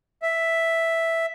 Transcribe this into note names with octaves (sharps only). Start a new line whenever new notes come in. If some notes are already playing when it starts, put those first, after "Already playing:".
E5